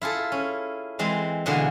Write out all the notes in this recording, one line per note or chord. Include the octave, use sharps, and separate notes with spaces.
E4 F4 G#4 A4
C#4
E3 G#3 C4
B2 D3 E3 G#3 A#3